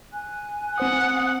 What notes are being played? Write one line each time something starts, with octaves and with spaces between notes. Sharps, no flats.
G#5 F#6
C4 C5 F#5 D#6